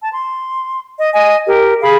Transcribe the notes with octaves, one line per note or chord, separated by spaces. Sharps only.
A5
C6
D#5
D#5 G#5
G4 A#4
G#4 F5 B5